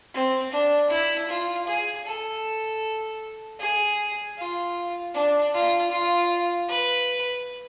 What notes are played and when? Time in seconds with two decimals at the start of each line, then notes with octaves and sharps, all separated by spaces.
0.14 C4
0.52 D4
0.90 E4
1.29 F4
1.67 G#4
2.06 A4
3.60 G#4
4.38 F4
5.14 D4
5.53 F4
5.91 F4
6.68 B4